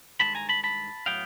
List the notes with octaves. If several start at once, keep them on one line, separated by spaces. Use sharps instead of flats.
G2 D#3 G#3 A5 B5
G#5 A#5
A5 B5
A5 B5
A2 F#3 B3 F5 G5